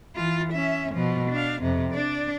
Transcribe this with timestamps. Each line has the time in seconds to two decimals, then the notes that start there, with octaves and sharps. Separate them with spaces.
0.15 E3 F4
0.53 C#4 E5
0.92 B2 F3
1.31 D4 F5
1.62 F2 C3
1.93 D4 D5